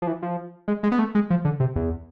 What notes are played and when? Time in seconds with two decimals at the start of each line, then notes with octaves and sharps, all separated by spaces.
0.02 F3
0.07 E3
0.22 F3
0.68 G#3
0.83 G#3
0.92 B3
0.99 A3
1.15 G#3
1.30 F3
1.45 D3
1.60 C3
1.76 E2